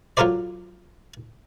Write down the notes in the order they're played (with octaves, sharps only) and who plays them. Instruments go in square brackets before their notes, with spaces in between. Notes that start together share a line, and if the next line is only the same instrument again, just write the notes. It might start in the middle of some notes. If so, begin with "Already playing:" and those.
[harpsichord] F#3 F4 A4 A#4 C5 D5